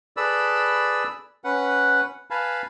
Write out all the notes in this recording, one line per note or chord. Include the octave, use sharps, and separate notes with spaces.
G#4 A4 B4 D5 B5 E6
C#4 B4 F#5
B4 F5 G#5 A5 B5